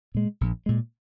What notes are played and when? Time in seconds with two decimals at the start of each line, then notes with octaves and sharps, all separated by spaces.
0.15 A#2 G#3
0.41 A#1
0.66 A#2 G#3